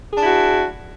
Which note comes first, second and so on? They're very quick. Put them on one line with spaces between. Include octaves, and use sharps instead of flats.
G#4 D4 E4 F#4